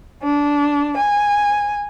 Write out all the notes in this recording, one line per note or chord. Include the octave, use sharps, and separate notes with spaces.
D4
G#5